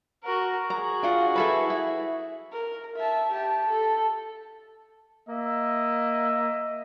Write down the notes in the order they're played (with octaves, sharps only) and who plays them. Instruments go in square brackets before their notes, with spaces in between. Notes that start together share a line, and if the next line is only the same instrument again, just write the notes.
[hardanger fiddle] F#4 A#4
[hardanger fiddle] F#4 G#4 [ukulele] A#5
[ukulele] D4 F4 F#5
E4 A4 B4
E4
[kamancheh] A#4
E5 A5
G4 A5
A4
[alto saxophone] A#3 [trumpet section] D#5 E5